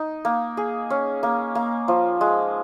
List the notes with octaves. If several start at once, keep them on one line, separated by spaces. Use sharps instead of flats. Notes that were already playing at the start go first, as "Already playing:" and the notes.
Already playing: D#4
A#3
G#4
C#4
A#3
A#3
F3
G#3